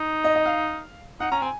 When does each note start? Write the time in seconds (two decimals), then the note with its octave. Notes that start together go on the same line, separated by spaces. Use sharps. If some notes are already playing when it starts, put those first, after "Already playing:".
Already playing: D#4
0.24 D#5
0.35 D#5
0.46 F5
1.20 D#4 F#5
1.31 C#4 A#5
1.42 C4 G#5